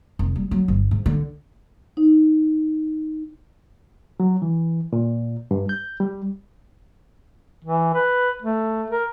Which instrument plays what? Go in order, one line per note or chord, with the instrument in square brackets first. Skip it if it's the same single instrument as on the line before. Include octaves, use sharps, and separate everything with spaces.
[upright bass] F1
G3
F#3
G1
G#2
D3
[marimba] D#4
[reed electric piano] F#3
E3
A#2
G2
G6
G3
[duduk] E3
B4
A3
A#4